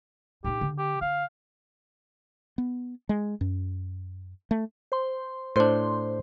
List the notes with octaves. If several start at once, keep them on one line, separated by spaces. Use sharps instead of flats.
A#2 D#4 G4
D3
G4
D3 F5
B3
G#3
F#2
A3
C5 C6
A2 D4 C5 C6